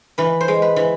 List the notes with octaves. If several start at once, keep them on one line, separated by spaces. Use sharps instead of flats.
E3 B4
C5
G#3
B4
E3